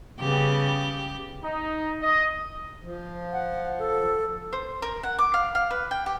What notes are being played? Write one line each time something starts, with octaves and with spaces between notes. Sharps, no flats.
C#3 G3 B3 G4
D#4
D#5
F3
F#5
A4
C5
A#4
F#5
D6
F5
F5
B4
G5
G4